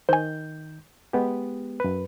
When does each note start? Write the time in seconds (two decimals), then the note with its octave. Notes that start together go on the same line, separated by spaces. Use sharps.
0.09 D#3 C5 G#5 G6
1.13 G#3 B3 G4
1.80 F#2 B4